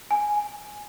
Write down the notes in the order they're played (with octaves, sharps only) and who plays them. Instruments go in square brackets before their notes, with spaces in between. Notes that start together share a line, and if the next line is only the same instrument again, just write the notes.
[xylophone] G#5